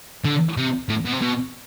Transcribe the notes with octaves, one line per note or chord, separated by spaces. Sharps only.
D3
C3
A2
B2
C3
B2